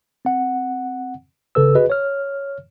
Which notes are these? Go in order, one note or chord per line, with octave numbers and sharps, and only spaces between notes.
C4 F#5
G#1 C#3 A4 B4 E6
F#4 G#4 B4 D#5
C#5 F6